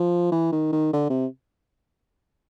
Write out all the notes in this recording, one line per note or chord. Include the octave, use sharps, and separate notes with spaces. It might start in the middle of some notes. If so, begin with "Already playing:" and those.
Already playing: F3
E3
D#3
D#3
D3
C3